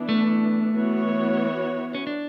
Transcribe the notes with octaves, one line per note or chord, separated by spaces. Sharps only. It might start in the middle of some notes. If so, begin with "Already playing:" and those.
Already playing: E3 B3 D4
A3
E3 B3 F#4 C#5
C#4
D4